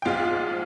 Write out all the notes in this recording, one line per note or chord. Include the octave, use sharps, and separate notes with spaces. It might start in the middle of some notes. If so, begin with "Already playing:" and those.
G5
A#1 G#2 F3 G#3 F4 F5